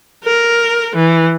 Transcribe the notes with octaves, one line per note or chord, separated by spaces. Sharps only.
A#4
E3